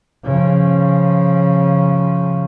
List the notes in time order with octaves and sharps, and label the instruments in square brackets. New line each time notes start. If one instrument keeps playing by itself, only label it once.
[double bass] C#3 F3